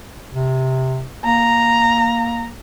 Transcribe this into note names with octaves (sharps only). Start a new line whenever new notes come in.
C3
A#3 A#5